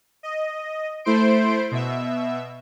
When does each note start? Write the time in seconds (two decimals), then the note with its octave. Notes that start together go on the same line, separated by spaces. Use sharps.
0.23 D#5
1.05 A3 E4 C5 C6 D7
1.71 B2 E5